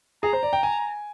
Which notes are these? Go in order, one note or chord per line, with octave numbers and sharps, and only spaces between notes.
G#4 A#5
C5
D5
G5
G#5